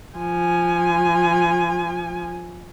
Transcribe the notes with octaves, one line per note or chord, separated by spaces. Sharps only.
F3 G#5